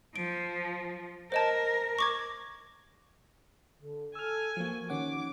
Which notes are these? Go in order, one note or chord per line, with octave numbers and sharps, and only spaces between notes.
F3 D7
A#4 C5 D#5 A5
C#6 D6 G#6
D3
A4 G#5 E6 F6
F3 A#3 F#4
D#3 C#4 F#5 D6